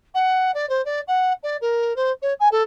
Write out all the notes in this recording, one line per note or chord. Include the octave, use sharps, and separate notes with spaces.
F#5
D5
C5
D5
F#5
D5
A#4
C5
C#5
G#5
A4